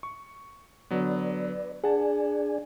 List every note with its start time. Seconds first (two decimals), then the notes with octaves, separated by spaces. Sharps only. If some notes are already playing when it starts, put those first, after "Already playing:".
0.03 C#6
0.91 D3 F#3 B3 B4 D5
1.84 D4 G#4 D5 F#5 G#5 A5